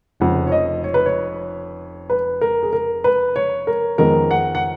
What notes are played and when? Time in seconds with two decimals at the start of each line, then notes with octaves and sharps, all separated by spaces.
0.20 F1 F2 C#3 F#5
0.47 C#5
0.52 D#5
0.84 C#5
0.94 B4
1.06 C#5
2.10 B4
2.41 A#4
2.63 G#4
2.73 A#4
3.04 B4
3.36 C#5
3.67 A#4
3.98 F2 D#3 G#3 B3 D#4 A#4
4.31 F#5
4.55 F#5